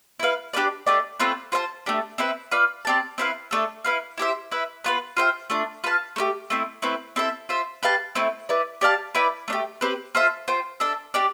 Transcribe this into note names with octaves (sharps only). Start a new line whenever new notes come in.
E4 B4 F5
D4 G4 B4 D5
A3 D4 G4 D5
A3 C4 F4 B4
F4 C5 F5 A5
A3 D4 G4
C4 E4 B4 E5
F4 B4 D5
C4 G4 D5 A5
C4 E4 B4 F5
A3 D4 A4
E4 B4 F5
E4 G4 C5 E5
E4 B4 E5
B3 F4 B4
F4 C5 E5 G5
A3 D4 F4
F4 B4 F5 A5
A3 E4 G4
A3 C4 E4
A3 C4 E4 B4
C4 E4 A4 E5
F4 C5 E5
G4 B4 F5 A5
A3 C4 E4
E4 B4 D5
G4 D5 F5 A5
E4 B4 D5 G5
A3 D4 G4
C4 G4 B4
F4 A4 C5 E5
F4 C5 G5
D4 A4 E5
D4 G4 D5